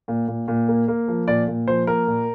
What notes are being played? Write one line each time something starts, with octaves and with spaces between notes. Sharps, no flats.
A#2
A#2
A#2
A#3
A#3
F3
A#2 D5
A#2
F3 C5
A#3 A#4
A#2